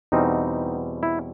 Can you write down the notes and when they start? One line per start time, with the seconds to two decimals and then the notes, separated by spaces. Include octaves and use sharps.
0.12 E2 B2 G3 C4 D#4
1.03 E4